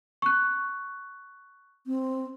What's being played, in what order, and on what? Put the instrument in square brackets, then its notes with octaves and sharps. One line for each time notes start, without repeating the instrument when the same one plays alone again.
[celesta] C#6 F#6
[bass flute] C4